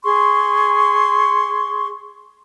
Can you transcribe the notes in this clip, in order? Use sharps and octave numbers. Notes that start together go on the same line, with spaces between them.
G#4 C6 C#6